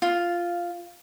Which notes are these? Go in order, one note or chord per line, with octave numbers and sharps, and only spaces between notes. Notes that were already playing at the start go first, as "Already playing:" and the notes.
F4